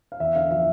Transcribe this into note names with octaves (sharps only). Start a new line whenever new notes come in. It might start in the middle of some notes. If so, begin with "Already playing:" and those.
F5
E2 E5
D3 F5
F3 E5